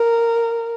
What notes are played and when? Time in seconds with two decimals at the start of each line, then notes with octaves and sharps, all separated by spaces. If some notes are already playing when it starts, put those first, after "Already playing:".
Already playing: A#4